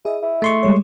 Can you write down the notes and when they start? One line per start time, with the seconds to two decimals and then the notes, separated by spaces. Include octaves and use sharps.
0.05 E4 G#4 D#5
0.23 E4
0.42 A3 C6 C#6
0.63 G3 G#3 C#5